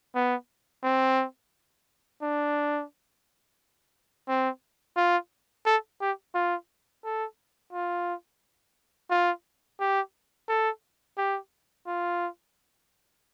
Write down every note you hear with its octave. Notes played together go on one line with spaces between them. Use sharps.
B3
C4
D4
C4
F4
A4
G4
F4
A4
F4
F4
G4
A4
G4
F4